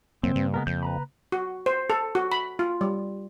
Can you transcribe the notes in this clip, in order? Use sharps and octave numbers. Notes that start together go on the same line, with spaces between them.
F#2 C#3 A#3 C4
G2
G#3 B3 A#4
F2 G6
B4 A#5 B5
F#4
C5
A4
F#4
B5
F4
G3